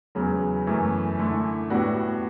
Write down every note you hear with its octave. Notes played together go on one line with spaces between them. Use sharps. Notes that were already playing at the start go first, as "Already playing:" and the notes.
E2 C#3 F#3
F#2 E3 A3
D3 A3 E4
A2 G3 B3 D4 F#4